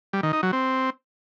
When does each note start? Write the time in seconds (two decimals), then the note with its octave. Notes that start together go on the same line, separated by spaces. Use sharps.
0.13 G3
0.23 D#3
0.33 D#4
0.43 F#3
0.53 C4